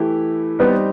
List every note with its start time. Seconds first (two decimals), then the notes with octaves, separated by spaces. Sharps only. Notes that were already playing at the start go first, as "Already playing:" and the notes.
Already playing: E3 A3 E4 G4
0.59 G3 B3 C4 D#4 G4